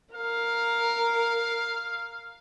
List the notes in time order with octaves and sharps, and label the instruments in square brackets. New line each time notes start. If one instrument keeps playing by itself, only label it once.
[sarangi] A#4 [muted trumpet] F5